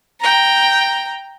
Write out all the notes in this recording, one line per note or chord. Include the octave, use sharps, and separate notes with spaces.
G5 A#5